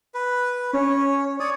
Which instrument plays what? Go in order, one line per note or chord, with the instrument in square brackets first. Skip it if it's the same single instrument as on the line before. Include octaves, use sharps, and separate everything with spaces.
[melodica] B4
[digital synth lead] C#4 [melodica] C#5
[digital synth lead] C#5 [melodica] D5 D#6